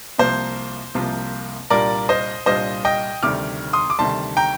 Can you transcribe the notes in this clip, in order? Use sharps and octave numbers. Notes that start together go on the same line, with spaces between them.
C2 C3 F3 A#3 F4 C5
C2 C3 F3 A#3 F4
C2 A#2 G3 D4 F4 A#4 D5
C5 D#5
C2 A#2 G3 D4 F4 C5 D#5
D#5 G5
D2 C3 D#3 G3 D6 F6
C6 D#6
D6
D2 C3 D#3 G3 A5 C6
G5 A#5